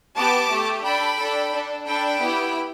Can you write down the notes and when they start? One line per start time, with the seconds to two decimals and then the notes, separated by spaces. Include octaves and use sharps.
0.16 B3 G4 A5 D6
0.50 A3 G4
0.84 D4 A4 G5 B5
1.19 D4 A4
1.52 D4 A4
1.86 D4 A4 G5 B5
2.20 B3 E4 G4